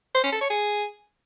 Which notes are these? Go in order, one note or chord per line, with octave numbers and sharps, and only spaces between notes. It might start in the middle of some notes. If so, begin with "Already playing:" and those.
C5
C#4
A4
C#5
G#4